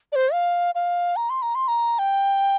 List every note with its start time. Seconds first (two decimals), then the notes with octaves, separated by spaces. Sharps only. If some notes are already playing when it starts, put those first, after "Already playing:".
0.12 D5
0.16 C5
0.33 F5
0.75 F5
1.16 A#5
1.30 C6
1.42 A#5
1.55 C6
1.68 A#5
1.99 G5